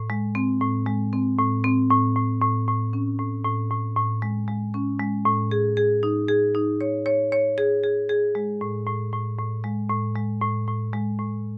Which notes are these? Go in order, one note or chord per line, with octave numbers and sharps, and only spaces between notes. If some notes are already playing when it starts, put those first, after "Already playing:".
Already playing: A2
G#3
C4
A2
G#3
C4
A2
C4
A2
A2
A2
A2
C#4
A2
A2
A2
A2
G#3
G#3
C#4
G#3
A2
G#4
G#4
D#4
G#4
D#4
C#5
C#5
C#5
G#4
G#4
G#4
G#3
A2
A2
A2
A2
G#3
A2
G#3
A2
A2
G#3
A2